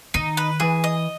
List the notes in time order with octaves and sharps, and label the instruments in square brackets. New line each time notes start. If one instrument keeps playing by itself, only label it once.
[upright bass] D#3 [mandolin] D#4
[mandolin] B4
[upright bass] E3 [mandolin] G#4
[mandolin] D#5